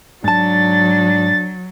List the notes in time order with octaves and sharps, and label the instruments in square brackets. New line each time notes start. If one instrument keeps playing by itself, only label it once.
[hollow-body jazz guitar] G#2 A5 [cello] F#3 [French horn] D4 [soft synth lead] A6